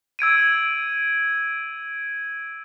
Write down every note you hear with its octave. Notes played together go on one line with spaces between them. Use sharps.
E6 G#6 D7 D#7